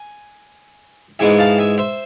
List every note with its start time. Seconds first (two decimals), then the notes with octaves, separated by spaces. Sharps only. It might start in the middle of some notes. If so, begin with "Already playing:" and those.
Already playing: G#5
1.19 G#2 E3 G#3 B3 E5 G#5
1.39 F5 A5
1.58 E5 G#5
1.78 C5 E5